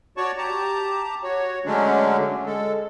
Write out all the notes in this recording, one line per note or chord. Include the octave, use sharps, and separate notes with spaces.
F#4 C#5 D5 A5 C#6
G4 A5 A#5
F#4 C#5
D3 F#3 G#3 A3 C#4 D4
G#3 A4